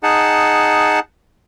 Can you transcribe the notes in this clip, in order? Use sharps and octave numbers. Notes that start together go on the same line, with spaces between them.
D#4 G#4 F#5 A5